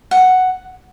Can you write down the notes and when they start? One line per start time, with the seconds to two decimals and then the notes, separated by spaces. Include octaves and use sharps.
0.11 F#5